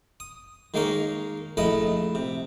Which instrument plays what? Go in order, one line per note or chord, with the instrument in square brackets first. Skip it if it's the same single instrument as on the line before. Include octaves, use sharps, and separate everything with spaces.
[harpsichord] D#6
D#3 G#3 A#3 D#4 A#4 C#5
A#1 C#3 A3 E4 D#5 D#6
C3